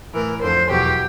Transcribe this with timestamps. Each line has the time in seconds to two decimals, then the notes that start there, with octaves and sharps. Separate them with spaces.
0.14 A2 E3 A#4
0.42 F2 D3 F3 C5
0.70 E2 B2 F#3 G4